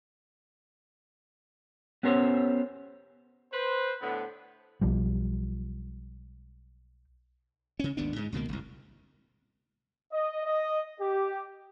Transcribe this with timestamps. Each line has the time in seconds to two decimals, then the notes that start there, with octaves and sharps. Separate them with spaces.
2.03 B3 C#4 G4 A#4 C5 C#5
3.53 B4 C5
4.02 A2 D3 B3
4.81 B1 F3 G3
7.80 C#3 C#4
7.97 G#1 D#2 B3 D4
8.16 G#2 G#3
8.32 C#2 B2 D#3 A#3
8.49 F#1 C2
10.11 D#5
10.45 D#5
11.00 G4